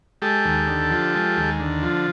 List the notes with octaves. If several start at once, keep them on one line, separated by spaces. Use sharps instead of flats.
G#3 G4 A4
D#2
D3
F3
G#3
D#2
D3
F3